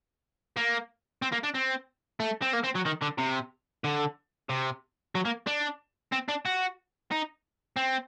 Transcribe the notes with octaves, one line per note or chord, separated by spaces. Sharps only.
A#3
C4
A#3
D4
C4
A3
C4
A#3
C4
F#3
D#3
D3
C3
D3
C3
F#3
A#3
D4
C4
D4
F#4
D#4
C4